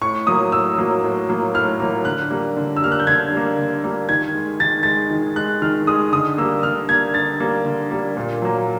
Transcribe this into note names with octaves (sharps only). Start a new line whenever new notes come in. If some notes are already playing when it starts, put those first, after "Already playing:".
A2 C#6
F#3 A#3 D#6
A2 E6
F#3 A#3
A2
F#3 A#3
A2 F6
F#3 A#3
D3 F#6
G3 A#3
D3
E6
G3 A#3 F6
F#6
G6
D3 G#6
G3 A#3
D3
G3 A#3
D#3 G#6
G#3
D#3 A6
G#3 A6
D#3
G#3 F#6
D#3 F6
G#3 D#6
D3 D#6
G3 A#3 E6
D3 F6
G3 A#3 G#6
D3 A6
G3 A#3
D3
G3 A#3
A#2
F#3 A#3